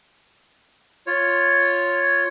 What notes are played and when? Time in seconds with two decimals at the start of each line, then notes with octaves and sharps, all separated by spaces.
1.07 F4 C#5